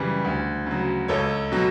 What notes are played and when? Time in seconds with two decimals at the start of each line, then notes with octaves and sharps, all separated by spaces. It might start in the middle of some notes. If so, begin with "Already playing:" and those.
Already playing: F#2 C#3 E3 G3
0.24 D2
0.67 C#3 F#3
1.08 C#2 A4 C#5
1.52 B2 F#3